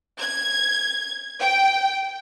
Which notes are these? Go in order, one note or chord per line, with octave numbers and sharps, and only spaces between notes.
G#6
G5